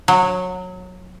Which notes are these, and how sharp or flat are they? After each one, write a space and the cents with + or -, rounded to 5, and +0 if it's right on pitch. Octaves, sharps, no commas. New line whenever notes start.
F#3 -20